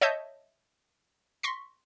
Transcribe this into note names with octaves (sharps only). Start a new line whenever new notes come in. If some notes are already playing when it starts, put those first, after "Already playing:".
C#5 D#5 E5 A5 G6
C6 C#6 A#6 B6